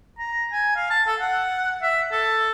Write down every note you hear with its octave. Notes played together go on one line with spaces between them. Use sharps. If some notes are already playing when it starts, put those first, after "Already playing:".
A#5
G#5
F5
A5
A4
F#5
E5
A4